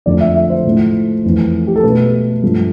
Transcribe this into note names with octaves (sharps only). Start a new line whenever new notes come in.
F2 D3 F3 A3 D5
E5
E5
C5
A2 F3 A3
F2 E3 A3
G4
A4
B2 A3 B4
G2 F3 A3